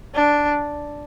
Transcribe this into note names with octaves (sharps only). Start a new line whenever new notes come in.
D4